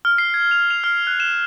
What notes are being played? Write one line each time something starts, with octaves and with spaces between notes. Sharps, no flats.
F6
C7
G#6
F7
F7
F6
F#6
E7